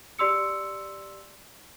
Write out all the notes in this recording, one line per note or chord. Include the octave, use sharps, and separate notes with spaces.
G4 D5 C6 E6 C#7